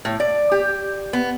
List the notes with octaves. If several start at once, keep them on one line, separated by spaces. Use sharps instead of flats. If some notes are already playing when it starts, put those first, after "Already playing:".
A2
D5
G4
B3